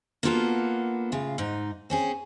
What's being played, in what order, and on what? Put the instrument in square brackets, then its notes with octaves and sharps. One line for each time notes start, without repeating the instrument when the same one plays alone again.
[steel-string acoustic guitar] A#3 B3 D4 F4 F#4 A4
A2 C#3 F4
G#2 D#4
C4 C#4 G#4